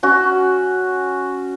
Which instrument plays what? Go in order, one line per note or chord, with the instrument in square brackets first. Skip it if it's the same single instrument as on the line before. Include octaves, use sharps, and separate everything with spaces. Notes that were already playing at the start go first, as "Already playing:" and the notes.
[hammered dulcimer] C#4 F#4